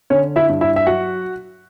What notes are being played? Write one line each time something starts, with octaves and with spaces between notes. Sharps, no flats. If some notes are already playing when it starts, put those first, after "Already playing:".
D3 C#4 C#5
E4 E5
G2
E4 E5
E5
F#3 F#4 F#5